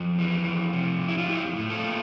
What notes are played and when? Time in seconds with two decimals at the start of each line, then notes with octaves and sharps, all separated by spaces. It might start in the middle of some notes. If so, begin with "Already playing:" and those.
Already playing: F2
0.19 E3
0.47 F2
0.73 C3
1.01 F2
1.09 E4
1.18 F4
1.28 F3 E4 G4
1.56 A2
1.70 F4 A4
1.83 A#3